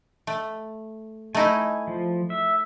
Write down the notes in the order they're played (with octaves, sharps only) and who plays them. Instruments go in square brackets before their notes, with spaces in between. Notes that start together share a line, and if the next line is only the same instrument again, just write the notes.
[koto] A3
[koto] A3 D#4 E4 [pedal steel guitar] G#5
[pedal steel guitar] F3
E5